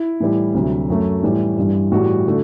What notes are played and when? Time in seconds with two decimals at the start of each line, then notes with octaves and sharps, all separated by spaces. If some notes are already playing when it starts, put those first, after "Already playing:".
Already playing: E4
0.20 A2 E3 G3
0.54 D2 C3 F#3
0.89 F#2 F#3 A3
1.23 A2 E3 G3
1.57 G2 E3 G3
1.91 A2 E3 G3 F#4
2.27 D3 A3